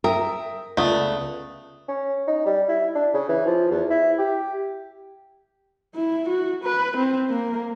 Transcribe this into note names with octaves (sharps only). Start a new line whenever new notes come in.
A#4 E5 G5 D#6
C#2 A3 B3 D5 D#6
C#4
D#4
G3
E4
D4
C#3
E3
F3
E2
E4
G4
E4
F#4
B4
C4
A#3